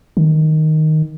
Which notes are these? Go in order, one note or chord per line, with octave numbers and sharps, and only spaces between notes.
D#3